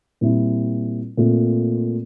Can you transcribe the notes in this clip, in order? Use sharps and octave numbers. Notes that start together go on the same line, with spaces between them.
A#2 G3 C4 E4
A#2 A3 C4 F4